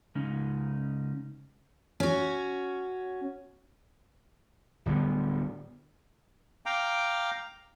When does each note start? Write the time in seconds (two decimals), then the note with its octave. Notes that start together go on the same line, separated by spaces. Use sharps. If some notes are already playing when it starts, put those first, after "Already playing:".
0.15 C#3 G#3 C#4 D#4
2.00 C#4 F#4
4.86 D1 D3 G3 B3
6.66 F5 G5 A#5 D6